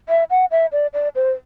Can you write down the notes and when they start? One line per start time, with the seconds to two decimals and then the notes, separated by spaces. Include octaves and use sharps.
0.09 E5
0.30 F#5
0.51 E5
0.72 D5
0.94 D5
1.15 C5